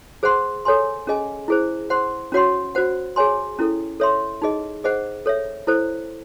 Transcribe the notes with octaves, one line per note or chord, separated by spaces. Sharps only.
G#4 C5 F#5 C6
A4 C#5 G#5 C6
C#4 G#4 D#5 G#5
E4 G#4 C5
C5 F#5 C6
C#4 F#4 C#5 F#5 C6
F#4 C5 F#5
G#4 C#5 G#5 C6
C#4 E4 A4
A4 C#5 E5 C6
D#4 G#4 D#5
G#4 C5 D#5 F#5
A4 C#5 E5
E4 A4 C5